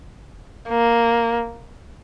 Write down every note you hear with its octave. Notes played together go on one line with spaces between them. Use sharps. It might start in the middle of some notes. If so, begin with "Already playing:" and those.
A#3